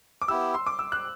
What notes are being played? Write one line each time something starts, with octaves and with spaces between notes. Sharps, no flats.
D6
B3 E4 G4 E6
C6
D6
E6
F#6